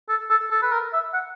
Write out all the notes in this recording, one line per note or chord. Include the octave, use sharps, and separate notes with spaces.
A4
A4
A4
B4
A#4
E5
F#5